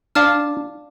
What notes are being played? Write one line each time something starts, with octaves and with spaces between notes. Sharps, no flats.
D4 D5 F5 A5 D6 F6